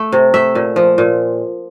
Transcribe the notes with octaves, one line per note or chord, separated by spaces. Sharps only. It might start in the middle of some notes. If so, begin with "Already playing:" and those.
Already playing: A3
C3
A3 E5
A#2
F3
A#2